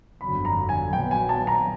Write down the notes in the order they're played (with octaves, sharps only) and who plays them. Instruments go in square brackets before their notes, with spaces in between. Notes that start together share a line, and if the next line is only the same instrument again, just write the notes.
[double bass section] G1 F2 D3 F#3 [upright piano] B5
[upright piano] A#5
G#5
[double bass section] A#1 A#2 F#3 B3 [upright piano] G5
[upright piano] G#5
A5
A#5